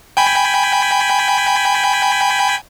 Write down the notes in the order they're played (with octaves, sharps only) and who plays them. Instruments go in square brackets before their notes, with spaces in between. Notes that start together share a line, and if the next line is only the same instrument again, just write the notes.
[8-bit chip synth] G5 G#5 B5